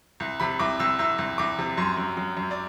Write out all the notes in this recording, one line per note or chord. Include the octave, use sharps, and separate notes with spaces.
C2
C3 B5
C2 D6
C2 E6
C2 E6
C2
C2 D6
C3
F#2 C6
F#2
F#2
F#2
D5